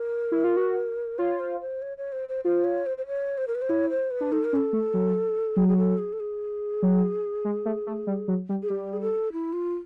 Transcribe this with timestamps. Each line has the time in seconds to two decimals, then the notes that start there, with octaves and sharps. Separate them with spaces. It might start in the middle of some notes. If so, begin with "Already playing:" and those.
Already playing: A#4
0.32 E4
0.44 F4
0.57 F#4
1.18 F4 C#5
1.40 C5
1.61 C5
1.82 C#5
1.98 C#5
2.12 C5
2.29 C5
2.45 F4 C5
2.64 C#5
2.86 C5
2.98 C5
3.07 C#5
3.38 C5
3.48 A#4
3.55 B4
3.62 C5
3.69 E4 C#5
3.90 C5
4.11 B4
4.21 D4
4.32 D#4 A4
4.44 A#4
4.53 C#4
4.56 A4
4.73 A3
4.94 F#3
5.56 F#3 G#4
5.68 G#4
5.78 A4
5.98 G#4
6.13 A4
6.20 G#4
6.82 F#3
7.45 G#3
7.65 A3
7.86 A3
8.07 G3
8.28 F#3
8.49 G3
8.62 G#4
8.69 G3 G4
8.93 G#4
9.01 A4
9.33 E4
9.53 F4